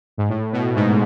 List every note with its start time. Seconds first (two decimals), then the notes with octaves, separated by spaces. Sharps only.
0.18 G#2
0.29 A2
0.53 B2
0.75 G#2